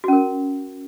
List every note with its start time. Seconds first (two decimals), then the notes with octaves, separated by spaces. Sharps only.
0.04 F#4
0.08 C#4
0.13 A#4